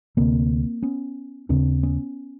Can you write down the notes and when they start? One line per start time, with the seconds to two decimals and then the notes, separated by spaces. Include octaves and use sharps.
0.17 D2 C3 A#3 C4
0.83 B3 C#4
1.49 D#2 C#3 C4 D4
1.83 B3 C#4